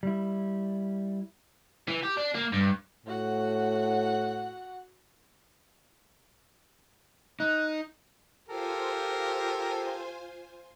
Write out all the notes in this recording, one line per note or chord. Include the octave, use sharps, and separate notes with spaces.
G3 E4
E3
G4
D4
A#3
G2
A2 F#4 F#5
D#4 F#6
F4 G4 A4 A#4 C5 G#5